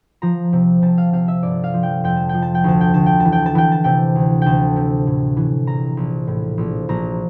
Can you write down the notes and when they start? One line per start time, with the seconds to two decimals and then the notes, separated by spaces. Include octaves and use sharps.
0.22 F3 A#5
0.53 C3
0.82 C3 A5
0.98 F5
1.13 C3 F5
1.28 E5
1.43 G1 D5
1.64 F5
1.74 F3
1.83 G5
2.04 F2 G5
2.17 A5
2.29 F3 G5
2.42 A5
2.55 G5
2.64 D2 A5
2.81 G5
2.94 D2 A5
3.06 G5
3.20 A5
3.25 E3
3.32 G5
3.46 A5
3.55 E3 G5
3.72 A5
3.84 C3 G5
4.15 D2
4.42 D2 G5 A5
4.76 C3
5.07 A2
5.37 E3
5.67 A#1 A#5
5.97 A#1
6.27 A2
6.58 A#1
6.89 A#1 A#5